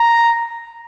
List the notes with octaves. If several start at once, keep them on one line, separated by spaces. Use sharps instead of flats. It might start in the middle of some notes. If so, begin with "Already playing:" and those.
Already playing: A#5